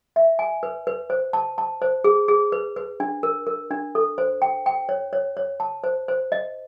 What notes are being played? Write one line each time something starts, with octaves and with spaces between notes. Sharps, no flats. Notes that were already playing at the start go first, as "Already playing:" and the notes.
E5
G#5
B4
B4
C5
A5
A5
C5
G#4
G#4
B4
B4
D4
A#4
A#4
D4
A4
C5
G5
G5
C#5
C#5
C#5
A5
C5
C5
D#5